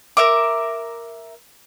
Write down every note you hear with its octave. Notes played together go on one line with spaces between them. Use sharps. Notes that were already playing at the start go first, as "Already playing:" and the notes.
A#4 E5 D6